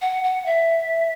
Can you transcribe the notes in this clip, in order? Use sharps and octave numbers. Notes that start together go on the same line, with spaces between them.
F#5
F#5
E5